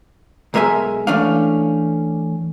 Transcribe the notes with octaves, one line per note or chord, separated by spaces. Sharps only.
B1 G#3 A#4 E5 G#5
E3 A3 C#4 D4 F5